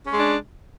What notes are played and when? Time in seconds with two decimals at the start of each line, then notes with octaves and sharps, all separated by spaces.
0.07 C#4
0.12 G#3
0.17 D4